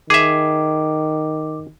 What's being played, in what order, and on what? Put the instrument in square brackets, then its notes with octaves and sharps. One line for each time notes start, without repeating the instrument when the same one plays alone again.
[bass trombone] D#3 [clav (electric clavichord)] G#4 E5 [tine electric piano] D6